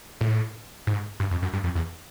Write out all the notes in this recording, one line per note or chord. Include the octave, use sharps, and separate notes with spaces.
A2
G#2
G2
F2
F#2
G2
F2
E2